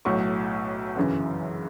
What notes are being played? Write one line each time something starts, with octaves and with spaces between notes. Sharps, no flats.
B1 A2 F#3 C#6
G1 F#2 C#3 E3